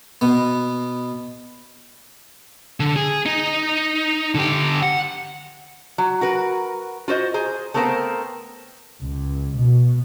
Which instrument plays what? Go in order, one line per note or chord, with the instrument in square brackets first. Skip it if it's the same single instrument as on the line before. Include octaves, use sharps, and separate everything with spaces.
[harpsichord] B2 B3
[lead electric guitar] D3
G#4
D#4
D3 G4
F#5
[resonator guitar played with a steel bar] F#3
F#4 A#4 B4
F4 F#4 C5 D#5
G#4 C5 A#5
A3 B3 C4 A#4 C5 F5
[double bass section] C#2
B2